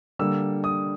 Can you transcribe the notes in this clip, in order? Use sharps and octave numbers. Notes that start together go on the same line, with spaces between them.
D3 G3 A#3 E6
D#6